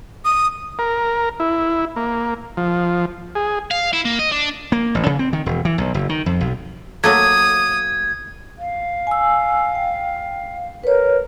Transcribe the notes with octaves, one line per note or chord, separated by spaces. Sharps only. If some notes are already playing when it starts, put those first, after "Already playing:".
D#6
A#4
E4
A#3
F3
G#4
F5
E4
A#3
D#5
D4
A#3
A1
C#3
C4
D#3
E1
E3
B1
F#1
D#3
F2
B1
F#3 A3 A#3 D#6 G#6
F5
G#5 E6
G5
A#4 B4 C#5